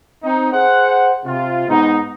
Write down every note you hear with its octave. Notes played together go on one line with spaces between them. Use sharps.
C4 D#4
G#4 C5 F#5
C3 F4
G#2 B3 D#4